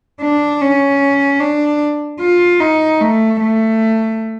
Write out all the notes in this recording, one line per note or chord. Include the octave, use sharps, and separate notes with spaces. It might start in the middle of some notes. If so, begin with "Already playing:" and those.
D4
C#4
D4
F4
D#4
A3
A3